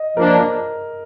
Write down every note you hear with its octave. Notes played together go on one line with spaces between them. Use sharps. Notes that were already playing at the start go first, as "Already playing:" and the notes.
Already playing: D#5
F3 A#3 D4 A#4